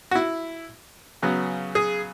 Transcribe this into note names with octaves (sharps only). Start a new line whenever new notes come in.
F#4
E4
C#3 F#3 B3
G#4